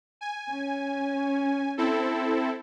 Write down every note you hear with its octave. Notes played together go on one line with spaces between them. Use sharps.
G#5
C#4
C4 E4 A4